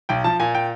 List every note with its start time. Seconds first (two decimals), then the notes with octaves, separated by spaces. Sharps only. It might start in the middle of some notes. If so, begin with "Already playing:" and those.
0.09 B1 G5
0.24 F3 A5
0.40 A#2 G#5
0.55 G5